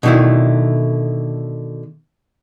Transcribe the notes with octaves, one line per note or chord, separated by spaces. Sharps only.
B2 D3 D#3 A3 E4